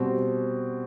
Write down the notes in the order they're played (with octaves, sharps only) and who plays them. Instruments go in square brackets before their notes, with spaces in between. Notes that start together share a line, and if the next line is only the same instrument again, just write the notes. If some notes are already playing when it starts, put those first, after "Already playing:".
Already playing: [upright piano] B2 G3 C4